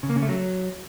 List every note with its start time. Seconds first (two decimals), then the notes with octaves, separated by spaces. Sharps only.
0.03 C#3
0.10 A#3
0.16 C#3
0.23 A3
0.29 F#3